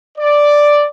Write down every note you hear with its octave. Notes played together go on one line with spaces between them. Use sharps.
D5